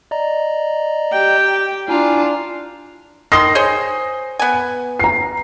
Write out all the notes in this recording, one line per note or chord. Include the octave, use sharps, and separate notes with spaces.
D5 D#5 A#5
G4 G5
D4 E4 F4 G#5 A#5
D#3 C6 D#6 A#6 C7
G#4 C5 C#5
B3 G#5
A#5 C7